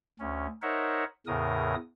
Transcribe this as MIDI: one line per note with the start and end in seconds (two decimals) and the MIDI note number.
0.20 0.47 38
0.20 0.47 61
0.62 1.04 63
0.62 1.04 70
0.62 1.04 72
0.62 1.04 73
0.62 1.04 76
0.62 1.04 78
1.27 1.75 40
1.27 1.75 45
1.27 1.75 49
1.27 1.75 70
1.27 1.75 87